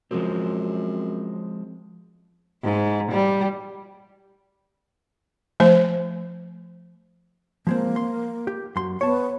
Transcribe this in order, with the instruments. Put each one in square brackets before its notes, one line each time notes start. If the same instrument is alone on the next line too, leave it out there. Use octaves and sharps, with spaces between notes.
[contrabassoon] F#2 [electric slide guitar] F3 G#3 C4
[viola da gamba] G#2
G3
[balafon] F3 A3 C5
[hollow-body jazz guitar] F3 G#3 C4 [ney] A#3
[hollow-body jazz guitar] C6
G4
F#2 C6
[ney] B3 [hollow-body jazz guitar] C#5 A5